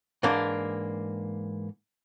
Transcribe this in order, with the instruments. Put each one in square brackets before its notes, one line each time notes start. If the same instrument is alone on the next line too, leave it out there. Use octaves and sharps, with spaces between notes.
[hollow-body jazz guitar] G#2 E3 A#3 D4